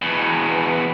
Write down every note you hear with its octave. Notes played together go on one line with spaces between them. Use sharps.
E2 B2